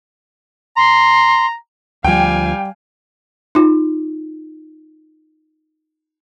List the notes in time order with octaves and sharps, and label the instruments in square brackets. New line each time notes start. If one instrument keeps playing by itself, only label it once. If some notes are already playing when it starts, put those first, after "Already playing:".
[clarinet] A#5 [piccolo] C6
[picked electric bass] D2 F3 [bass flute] G3 [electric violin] F5 G#5 [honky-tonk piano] G5
[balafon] D#4 F4